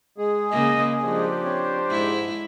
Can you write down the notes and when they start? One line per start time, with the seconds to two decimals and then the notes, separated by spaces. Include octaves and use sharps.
0.18 G#3 G#4
0.52 C#3 A#3 D#5
1.03 F3 D4 G4 C5
1.43 C4 C#5
1.87 G#2 G#3 E4